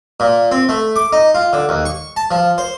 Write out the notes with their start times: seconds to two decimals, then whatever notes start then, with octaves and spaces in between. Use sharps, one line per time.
0.20 A#2
0.51 C4
0.69 A3
0.96 D6
1.13 D#4
1.35 F4
1.53 D3
1.69 D#2
1.85 C#6
2.16 A5
2.31 F3
2.58 C5